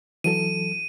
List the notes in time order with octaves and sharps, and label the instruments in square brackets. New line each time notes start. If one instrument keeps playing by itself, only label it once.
[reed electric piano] E3 F#3 A4 [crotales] D#7